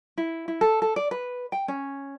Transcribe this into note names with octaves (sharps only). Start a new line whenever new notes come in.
E4
E4
A4
A4
D5
B4
G5
C#4